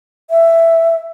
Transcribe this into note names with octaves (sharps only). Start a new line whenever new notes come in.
E5